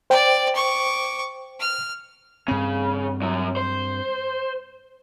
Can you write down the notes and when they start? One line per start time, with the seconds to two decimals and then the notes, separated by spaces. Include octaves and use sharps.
0.10 C5 D5 G5
0.55 C#6 D6
1.60 F6
2.48 G2 C#3 C4
3.22 F#2 F#3
3.57 C5